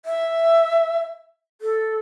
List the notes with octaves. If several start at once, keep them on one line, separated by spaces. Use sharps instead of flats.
E5
A4